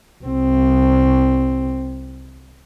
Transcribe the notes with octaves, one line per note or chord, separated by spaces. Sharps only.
C2 C4